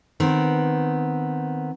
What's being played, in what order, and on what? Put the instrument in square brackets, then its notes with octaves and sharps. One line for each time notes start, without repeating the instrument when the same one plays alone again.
[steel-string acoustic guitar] D#3 B3 C4